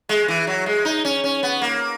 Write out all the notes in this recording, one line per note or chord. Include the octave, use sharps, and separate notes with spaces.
G#3
E3
F#3
G#3
D#4
C#4
C#4
B3
A#3